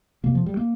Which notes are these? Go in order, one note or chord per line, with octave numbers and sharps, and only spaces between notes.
F2 C3 A#3
F3
G3
A#3